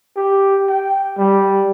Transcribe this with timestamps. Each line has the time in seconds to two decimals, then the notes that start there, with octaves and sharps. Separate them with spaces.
0.17 G4
0.69 G5
1.18 G3